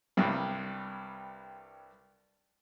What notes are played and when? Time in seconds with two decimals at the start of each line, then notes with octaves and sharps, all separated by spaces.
0.17 C2 G2